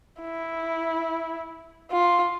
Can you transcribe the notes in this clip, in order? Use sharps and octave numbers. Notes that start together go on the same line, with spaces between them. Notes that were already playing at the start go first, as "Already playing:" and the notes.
E4
F4